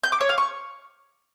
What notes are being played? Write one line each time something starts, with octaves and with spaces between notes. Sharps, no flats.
G6
D6
C#5
F5
C#6